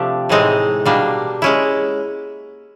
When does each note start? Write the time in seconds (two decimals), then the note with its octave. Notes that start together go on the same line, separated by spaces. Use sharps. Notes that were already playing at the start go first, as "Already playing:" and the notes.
Already playing: C3 F3 A3 D4 G4
0.29 A2 E3 G#3 C4 D#4
0.85 B2 G3 A#3 D4
1.42 G#3 C#4 E4